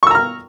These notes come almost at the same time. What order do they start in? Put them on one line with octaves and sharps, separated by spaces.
C#6 E6 A#5 F6